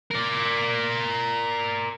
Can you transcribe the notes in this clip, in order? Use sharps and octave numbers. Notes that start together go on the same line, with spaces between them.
A#4 D5